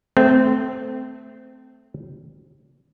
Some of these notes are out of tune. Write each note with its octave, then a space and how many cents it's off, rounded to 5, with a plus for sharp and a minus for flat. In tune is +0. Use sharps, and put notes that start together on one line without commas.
A3 +0 C4 -20